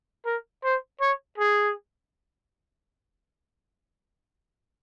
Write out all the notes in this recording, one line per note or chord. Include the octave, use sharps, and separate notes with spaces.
A#4
C5
C#5
G#4